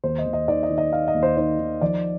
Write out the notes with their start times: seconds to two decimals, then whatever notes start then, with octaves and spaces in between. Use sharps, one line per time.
0.04 D#2 C5
0.18 D#5
0.26 D#2
0.33 D#5
0.48 D#3 D5
0.63 D#5
0.70 D#3
0.78 D#5
0.92 D#3 F5
1.08 D#5
1.15 D#2
1.23 C5
1.37 D#3 C5
1.59 D#3
1.81 F3 D5